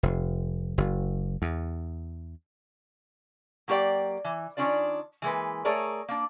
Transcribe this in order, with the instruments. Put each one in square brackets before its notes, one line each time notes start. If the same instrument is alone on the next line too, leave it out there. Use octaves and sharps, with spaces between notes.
[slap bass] F1
F#1
E2
[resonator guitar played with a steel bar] F#3 A#3 G4 B4 D5 G5
E3
D#3 A#3 C#4 D4 F4 D5
E3 G#3 A#3 B4
A3 G#4 A#4 C#5 D5
A#3 D4